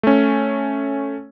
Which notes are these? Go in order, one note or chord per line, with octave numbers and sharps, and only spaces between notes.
A3 C#4